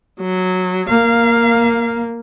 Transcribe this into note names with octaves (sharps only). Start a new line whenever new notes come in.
F#3
A#3 F5